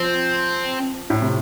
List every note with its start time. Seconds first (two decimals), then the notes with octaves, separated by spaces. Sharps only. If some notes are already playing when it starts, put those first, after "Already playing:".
Already playing: F3 C4
1.10 A2
1.22 C3